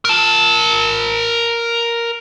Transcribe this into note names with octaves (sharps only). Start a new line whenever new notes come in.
A#4 A5